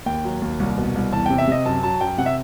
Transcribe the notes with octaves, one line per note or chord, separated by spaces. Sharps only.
D#2 G5
F#3
D#2
C2
B2
C2
E2 A5
C3 G5
E5
C3 D#5
F#2 A5
F#3 A5
F#2 G5
C3 F#5
E5